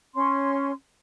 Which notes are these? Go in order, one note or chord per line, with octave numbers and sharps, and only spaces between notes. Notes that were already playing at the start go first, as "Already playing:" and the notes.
C#4 C6